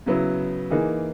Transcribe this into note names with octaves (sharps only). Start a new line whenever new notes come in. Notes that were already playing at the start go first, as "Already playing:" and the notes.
C#3 F#3 B3 E4
E3 A#3 D#4 G#4